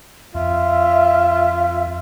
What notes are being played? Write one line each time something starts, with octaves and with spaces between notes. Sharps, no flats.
F2 F4 E5